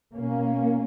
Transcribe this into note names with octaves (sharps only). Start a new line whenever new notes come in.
B2 A#3 C#4